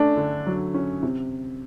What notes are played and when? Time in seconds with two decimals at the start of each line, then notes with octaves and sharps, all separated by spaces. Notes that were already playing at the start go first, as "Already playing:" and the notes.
Already playing: A3 C#4 D4
0.17 D3
0.46 F#3
0.74 C#4
1.03 C3